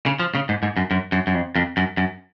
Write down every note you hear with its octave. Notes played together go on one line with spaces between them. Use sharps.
C#3
F3
C#3
G#2
G#2
F#2
F#2
F#2
F#2
F2
F2
F#2
F#2